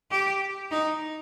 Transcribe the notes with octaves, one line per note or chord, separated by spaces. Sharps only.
G4
D#4